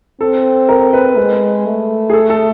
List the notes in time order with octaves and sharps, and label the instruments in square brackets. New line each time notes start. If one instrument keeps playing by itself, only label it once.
[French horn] C4 [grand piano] A4
[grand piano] A#4
B4
[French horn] G#3 [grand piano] B4
[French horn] A3
[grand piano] G#4
A4
A4